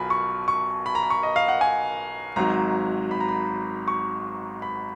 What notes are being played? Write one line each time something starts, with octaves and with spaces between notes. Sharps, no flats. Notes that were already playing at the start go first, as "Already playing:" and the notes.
Already playing: B1 B2 F4 G#5 A#5 B5
C#6
C#6
B5
A#5
B5
C#6
D#5
F5
F#5
G#5
G#1 G#2 F#3 A#5
B5
A#5
B5
C#6
B5